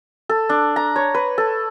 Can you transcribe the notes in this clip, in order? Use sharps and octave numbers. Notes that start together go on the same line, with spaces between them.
A4
D4
A#5
C#5
B4
A4